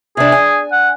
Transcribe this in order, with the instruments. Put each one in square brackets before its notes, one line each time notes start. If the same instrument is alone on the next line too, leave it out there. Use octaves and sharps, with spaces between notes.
[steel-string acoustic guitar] C3 D4 [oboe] G#4
[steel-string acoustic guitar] G#5
[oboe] F#5